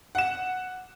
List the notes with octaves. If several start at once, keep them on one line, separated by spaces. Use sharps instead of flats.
F#5 E7